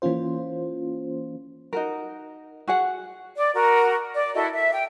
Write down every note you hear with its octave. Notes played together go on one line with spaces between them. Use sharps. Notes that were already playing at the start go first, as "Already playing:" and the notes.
E3 A#3 C#4 F4 C5
D#4 F#4 A#4
F#4 G#4 F#5
D5
F#4 A#4
D5
E4 F#4 A4 D#5
E5
G5